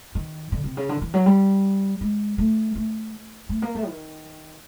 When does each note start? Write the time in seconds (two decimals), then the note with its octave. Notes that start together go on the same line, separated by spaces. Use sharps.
0.15 D#3
0.52 D3
0.64 C3
0.77 C#3
0.89 D3
1.02 E3
1.14 F#3
1.26 G3
2.01 G#3
2.38 A3
2.75 A3
3.49 A3
3.62 A#3
3.75 A3
3.87 D#3